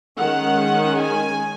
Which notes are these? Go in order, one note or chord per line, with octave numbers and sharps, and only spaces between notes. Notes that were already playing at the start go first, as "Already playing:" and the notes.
D#3 G#3 C#4 F#5
G#5